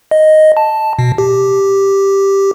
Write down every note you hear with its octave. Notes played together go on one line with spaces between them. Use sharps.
D#5
A5
B2
G4